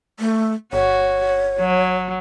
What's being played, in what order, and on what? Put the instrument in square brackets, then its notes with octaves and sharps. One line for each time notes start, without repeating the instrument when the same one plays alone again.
[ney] A3
[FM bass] G1 [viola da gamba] F#4 [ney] C#5
[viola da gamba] F#3